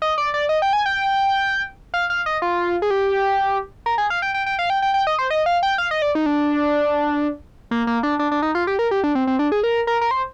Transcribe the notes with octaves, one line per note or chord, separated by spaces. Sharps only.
D#5
D5
D5
D#5
G5
G#5
G5
F5
F5
D#5
F4
G#4
G4
A#4
G#4
F5
G5
G5
G5
F5
G5
G5
G5
D#5
C5
D#5
F5
G5
F5
D#5
D5
D#4
D4
A#3
A#3
D4
D4
D4
D#4
F4
G4
A#4
G4
D4
C4
C4
D4
G#4
A#4
A#4
A#4
C5